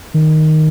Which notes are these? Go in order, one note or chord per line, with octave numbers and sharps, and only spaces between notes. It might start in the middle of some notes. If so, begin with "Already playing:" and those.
D#3